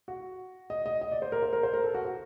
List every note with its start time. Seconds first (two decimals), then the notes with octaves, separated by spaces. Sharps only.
0.08 F#4
0.70 D#5
0.86 D#5
1.01 D#5
1.12 D5
1.22 C5
1.32 A#4
1.43 C5
1.53 A#4
1.63 C5
1.74 A#4
1.84 A4
1.94 F#4
2.05 F#4